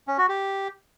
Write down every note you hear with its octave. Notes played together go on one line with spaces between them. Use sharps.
C#4
F#4
G4